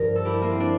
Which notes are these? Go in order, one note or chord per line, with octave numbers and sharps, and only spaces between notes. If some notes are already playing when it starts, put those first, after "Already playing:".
Already playing: G2 F3 A#4
A4
E4 G4
A#3
C4
D4